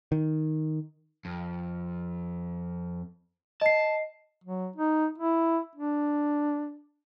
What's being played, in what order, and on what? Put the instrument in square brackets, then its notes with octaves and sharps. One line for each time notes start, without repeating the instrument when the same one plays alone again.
[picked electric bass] D#3
[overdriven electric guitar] F2
[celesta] D#5 C7 [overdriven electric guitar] A5
[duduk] F#3
D#4
E4
D4